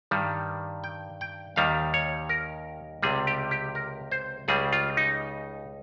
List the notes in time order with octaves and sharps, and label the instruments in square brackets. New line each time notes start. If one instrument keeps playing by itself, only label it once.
[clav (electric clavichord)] G2 D#3 G3
G5
G5
D#2 D#3 G3 F5
C#5
A#4
C#2 C3 G3 G#4
G4
G4
A#4
C5
C#2 C#3 G3 G#4
F4
D#4